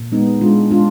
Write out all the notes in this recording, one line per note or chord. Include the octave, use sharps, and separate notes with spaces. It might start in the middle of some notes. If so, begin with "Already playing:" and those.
Already playing: A#2
G#3 B3 D#4
G#3 D4 F4
G#3 D4 F4